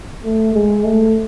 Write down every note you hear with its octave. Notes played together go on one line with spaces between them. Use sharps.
A3
G#3
A3